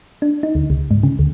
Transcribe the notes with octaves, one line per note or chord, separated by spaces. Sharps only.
D4
D#4
D2
C#2
G#2
C#3
D2